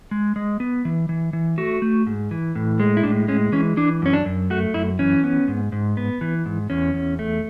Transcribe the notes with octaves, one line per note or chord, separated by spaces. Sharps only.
G#3
G#3
B3
E3
E3
E3
A3 F#4
A3
G#2
E3
A2
G#3
E4
A2 D4
G#3 C#4
E3 C#4
E3 D4
F#2 C#4
D4
F#2
A3 F#4
F#2 E4
E3 C#4
B3
G#2
G#2
B3
E3
G#2
E2 C#4
E2
A3